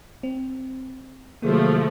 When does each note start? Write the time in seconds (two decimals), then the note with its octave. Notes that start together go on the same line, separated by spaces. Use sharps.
0.23 C4
1.42 C3 D#3 F3 F#3 A3 A#3 G#4